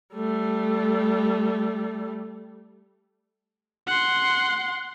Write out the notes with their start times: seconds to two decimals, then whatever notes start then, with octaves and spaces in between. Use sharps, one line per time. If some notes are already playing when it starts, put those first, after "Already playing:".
0.14 G3 A3
3.87 F#5 C6